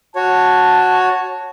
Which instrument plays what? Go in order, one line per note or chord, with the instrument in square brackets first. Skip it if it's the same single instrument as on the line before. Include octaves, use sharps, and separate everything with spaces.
[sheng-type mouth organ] F#4 C#5 [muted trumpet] A5